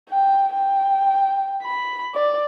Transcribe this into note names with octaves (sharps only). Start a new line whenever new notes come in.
G5
G5
B5
D5